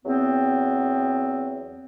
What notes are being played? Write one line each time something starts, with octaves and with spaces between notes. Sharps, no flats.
E2 F#3 B3 C4